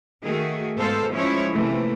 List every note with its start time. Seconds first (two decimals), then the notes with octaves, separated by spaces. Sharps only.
0.23 D#3 A3 F#4 G#4
0.77 G#2 B2 A4 C5 F5
1.12 F3 G#3 C#4 E4 C#5
1.51 C3 E3 A3 A#3